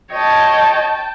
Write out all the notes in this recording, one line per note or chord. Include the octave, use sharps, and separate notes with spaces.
C#5 D#5 G5 A5